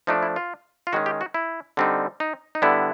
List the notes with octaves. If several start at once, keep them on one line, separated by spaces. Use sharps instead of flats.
F3 A3 D4 D#4
E4
F4
F4
D#3 G#3 C#4 F#4
G4
F#4
E4
D3 G3 C4 D#4
D#4
D#4
D3 G3 B3 E4